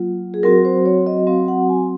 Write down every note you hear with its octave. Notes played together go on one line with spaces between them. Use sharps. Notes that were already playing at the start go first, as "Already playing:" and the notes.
Already playing: F#3 A#3 F4
G#4
F#3 C4 F#4 A#4
C5
C#5
D#5
F#3 C4 F#4 F5
F#5
G#5